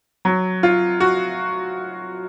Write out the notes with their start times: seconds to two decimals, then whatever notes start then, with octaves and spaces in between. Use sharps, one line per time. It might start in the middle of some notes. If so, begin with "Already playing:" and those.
0.25 F#3
0.63 F4
1.00 F#4